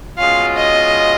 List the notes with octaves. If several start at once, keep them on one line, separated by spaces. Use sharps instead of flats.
B2 G#3 C#4 F4 F5
D#5